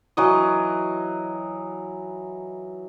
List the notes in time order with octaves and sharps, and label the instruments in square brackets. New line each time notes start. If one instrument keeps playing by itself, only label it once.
[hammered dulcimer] E3 F#3 D#5